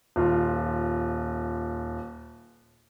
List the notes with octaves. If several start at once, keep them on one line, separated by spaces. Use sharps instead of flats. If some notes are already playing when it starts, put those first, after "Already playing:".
D#1 F4